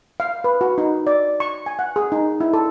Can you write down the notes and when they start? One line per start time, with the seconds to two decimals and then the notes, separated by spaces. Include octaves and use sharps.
0.20 F5
0.44 B4
0.61 F#4
0.78 D#4
1.07 D5
1.40 C#6
1.66 G#5
1.79 F#5
1.96 G#4
2.12 D#4
2.40 E4
2.53 A4